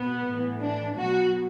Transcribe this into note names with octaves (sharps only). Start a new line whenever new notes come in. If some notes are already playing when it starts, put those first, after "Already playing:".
Already playing: B2 B3
A2 E3
D4
B2 F#3 F#4